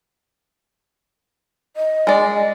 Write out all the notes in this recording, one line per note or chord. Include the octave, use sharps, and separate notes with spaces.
D#5
G#3 D5